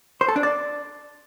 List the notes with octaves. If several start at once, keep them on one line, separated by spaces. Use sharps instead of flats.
C5
A4
D4
D5